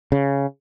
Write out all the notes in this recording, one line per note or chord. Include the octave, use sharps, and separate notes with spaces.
C#3